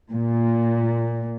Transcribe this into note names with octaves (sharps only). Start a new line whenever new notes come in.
A#2